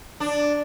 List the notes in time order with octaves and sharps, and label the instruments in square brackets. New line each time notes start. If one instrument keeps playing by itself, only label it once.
[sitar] D4